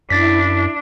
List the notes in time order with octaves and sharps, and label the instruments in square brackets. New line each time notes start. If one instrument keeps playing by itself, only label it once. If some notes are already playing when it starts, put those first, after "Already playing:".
[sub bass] F#2 [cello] D4 [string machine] E4 [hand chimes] A6 B6